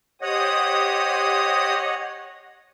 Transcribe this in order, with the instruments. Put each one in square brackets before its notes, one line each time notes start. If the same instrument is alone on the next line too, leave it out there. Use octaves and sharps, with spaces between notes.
[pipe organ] G4 C5 D#6 [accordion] C#5 D#5 F#5